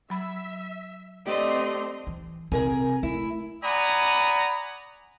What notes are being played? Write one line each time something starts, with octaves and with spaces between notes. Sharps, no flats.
F#3 E5 B5
A3 C4 D4 G4 D#5 C6
E3
C3 G#4 A#4 G#5
A3 E4
D5 F#5 G#5 A#5 B5 D#6